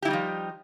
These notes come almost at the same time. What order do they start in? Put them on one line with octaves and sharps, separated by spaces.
G4 E4 G3 D#4 F3